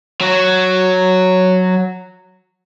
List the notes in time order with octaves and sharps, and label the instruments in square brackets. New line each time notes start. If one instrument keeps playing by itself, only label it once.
[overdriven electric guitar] F#3 F#4